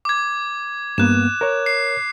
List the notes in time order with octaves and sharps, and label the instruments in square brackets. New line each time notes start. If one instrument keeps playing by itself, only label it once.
[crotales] D6 G#6
[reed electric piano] G2 A#3 B3 [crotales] F#6 E7
[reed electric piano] A#4 C#5
[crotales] C7